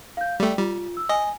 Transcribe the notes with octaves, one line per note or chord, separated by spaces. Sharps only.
F5 G6
G3 A3 D5 G5
G3 F4
E6
D#5 G#5